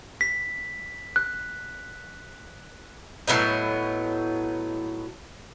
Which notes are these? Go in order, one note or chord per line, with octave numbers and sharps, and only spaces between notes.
B6
F#6
A2 F#3 B3 D#4